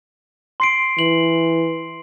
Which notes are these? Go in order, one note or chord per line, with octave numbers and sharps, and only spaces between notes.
C6 C7 D7
E3 F#7